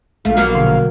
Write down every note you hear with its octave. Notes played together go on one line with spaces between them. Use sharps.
A#1 A3 F5
F#3 A#3 B3
B2 D3